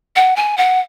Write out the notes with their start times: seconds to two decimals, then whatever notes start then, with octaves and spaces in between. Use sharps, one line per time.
0.16 F#5
0.36 G#5
0.57 F#5